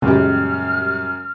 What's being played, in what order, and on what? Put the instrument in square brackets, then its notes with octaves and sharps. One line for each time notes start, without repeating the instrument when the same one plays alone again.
[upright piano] F#2 [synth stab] A#2 G3 G4 [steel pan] C#3 G#3 [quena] F6